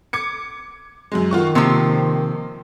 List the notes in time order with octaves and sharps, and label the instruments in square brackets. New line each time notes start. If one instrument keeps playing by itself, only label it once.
[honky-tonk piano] D6 G#6 C#7
F#2 F#3 G#3
[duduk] D#3 [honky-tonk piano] F4 F#4 C#6
[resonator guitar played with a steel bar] C3 F3 [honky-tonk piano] A#3 C6